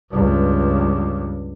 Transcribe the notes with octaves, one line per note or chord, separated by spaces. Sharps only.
C#2 G2